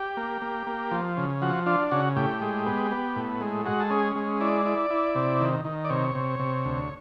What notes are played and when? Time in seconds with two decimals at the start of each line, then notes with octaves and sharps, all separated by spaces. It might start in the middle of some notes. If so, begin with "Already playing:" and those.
Already playing: G4
0.17 A#3
0.42 A#3
0.67 A#3
0.91 F3
1.17 C#3
1.42 F3 F#4
1.66 D4 F4
1.91 C#3 F#4
2.16 A2 G4
2.41 G#3
2.66 B3
2.91 B3
3.16 A2
3.41 G#3
3.65 G#3 F#4
3.80 A4
3.90 C#4 G#4
4.16 G#3
4.40 E4 D5
4.65 E4
4.90 E4
5.15 C3
5.41 D#3
5.65 D#3
5.85 D5
5.90 C3 C#5
6.15 C3
6.39 C3
6.65 D2